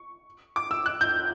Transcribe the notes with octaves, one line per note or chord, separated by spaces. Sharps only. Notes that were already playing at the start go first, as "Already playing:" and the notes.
Already playing: C#6
D6
E6
F#6
G6